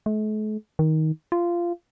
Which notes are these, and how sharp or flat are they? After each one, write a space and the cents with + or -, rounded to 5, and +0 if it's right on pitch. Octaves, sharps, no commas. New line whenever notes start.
A3 -45
D#3 +15
F4 -15